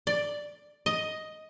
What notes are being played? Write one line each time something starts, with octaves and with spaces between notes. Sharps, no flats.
D5
D#5